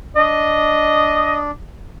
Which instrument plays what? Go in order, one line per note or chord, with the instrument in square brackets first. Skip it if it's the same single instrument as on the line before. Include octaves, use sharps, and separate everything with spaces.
[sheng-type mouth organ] D4 [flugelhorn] D#5